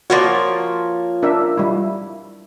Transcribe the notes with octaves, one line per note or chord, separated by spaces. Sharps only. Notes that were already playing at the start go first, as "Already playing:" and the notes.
F3 A#3 F#4 C#5 D5
D4 A#4 E5
G3 E4